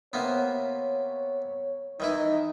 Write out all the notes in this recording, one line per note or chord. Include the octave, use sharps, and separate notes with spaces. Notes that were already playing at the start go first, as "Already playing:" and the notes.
C3 A#3 B3 C#5
D#3 E3 D#4 E4